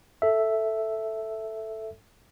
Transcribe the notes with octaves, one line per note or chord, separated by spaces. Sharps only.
A4 E5